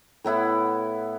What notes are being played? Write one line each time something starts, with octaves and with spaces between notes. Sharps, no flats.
A2 B3 E4 F#5